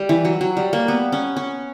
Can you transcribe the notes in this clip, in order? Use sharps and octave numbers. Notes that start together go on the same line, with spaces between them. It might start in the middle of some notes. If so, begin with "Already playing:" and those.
Already playing: G3
E3
F#3
F#3
G3
A#3
B3
C#4
C#4